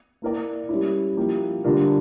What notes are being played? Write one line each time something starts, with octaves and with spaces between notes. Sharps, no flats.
A#3 E4 A#4 D5
G3 C#4 E4
F3 A#3 E4 G4
D3 G3 D4 F4 A#4